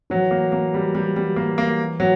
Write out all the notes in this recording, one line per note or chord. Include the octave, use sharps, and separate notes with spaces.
E3 F#3
A#3
A#3
G3
G3
G3
A#3
A#3
F#3